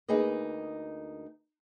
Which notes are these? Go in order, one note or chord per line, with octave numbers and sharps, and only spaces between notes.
D2 A#3 D#4 G#4 B4 D#5